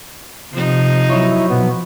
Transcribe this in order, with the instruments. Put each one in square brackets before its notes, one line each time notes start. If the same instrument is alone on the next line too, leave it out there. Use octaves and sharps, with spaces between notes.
[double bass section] C3 [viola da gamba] F3 D#4
[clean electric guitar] F#3 C#5 [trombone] E4
[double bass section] B2 F3 [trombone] B3